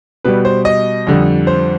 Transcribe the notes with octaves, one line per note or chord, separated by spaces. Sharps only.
B2 G3 B4
C5
D#5
F2 D3 G3
C5